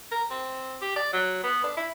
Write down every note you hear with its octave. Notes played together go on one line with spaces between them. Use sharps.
A#4
C4
G4
D5
F#3
B3
D4
E4